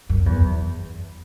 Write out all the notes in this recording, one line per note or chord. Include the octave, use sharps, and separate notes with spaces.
F#2
E2